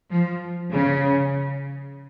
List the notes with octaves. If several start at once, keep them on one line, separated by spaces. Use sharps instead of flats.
F3
C#3